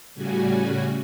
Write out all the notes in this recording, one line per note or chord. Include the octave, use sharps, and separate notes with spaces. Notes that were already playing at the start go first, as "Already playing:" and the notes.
A2 C#3 G3 F#4 G#5